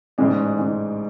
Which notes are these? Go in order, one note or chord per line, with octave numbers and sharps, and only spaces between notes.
A1 G#2 G#3 D5
G#3